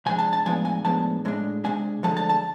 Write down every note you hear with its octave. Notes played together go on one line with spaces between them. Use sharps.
C3 F3 G#3 D4 G#5
A5
A5
A2 F3 G#3 B3 D4 G#5
G#5
A2 F3 G#3 B3 D4 A5
A2 G#3 D4
C3 G#3 D4 G#5
D2 D3 F3 G#3 A5
A5
A5